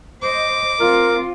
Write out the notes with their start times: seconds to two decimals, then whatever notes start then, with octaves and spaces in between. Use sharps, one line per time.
0.22 C5 D#5 D6
0.80 C4 F4 A#4